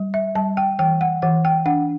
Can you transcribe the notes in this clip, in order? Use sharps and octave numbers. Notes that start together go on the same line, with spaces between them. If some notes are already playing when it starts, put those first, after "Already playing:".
Already playing: G3
E5
G3 A5
G5
E3 G5
F#5
E3 F#5
G5
D4 F#5